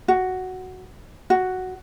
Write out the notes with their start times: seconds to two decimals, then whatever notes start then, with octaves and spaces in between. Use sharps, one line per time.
0.08 F#4
1.30 F#4